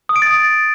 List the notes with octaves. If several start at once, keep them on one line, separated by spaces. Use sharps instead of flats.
D#6
D7
A6